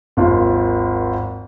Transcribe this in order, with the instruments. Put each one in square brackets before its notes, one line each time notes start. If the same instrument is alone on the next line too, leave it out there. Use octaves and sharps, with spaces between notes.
[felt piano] G#1 D#2 F4